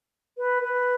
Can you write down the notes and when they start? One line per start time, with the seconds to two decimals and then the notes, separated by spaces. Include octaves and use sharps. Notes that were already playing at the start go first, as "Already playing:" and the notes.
0.38 B4
0.63 B4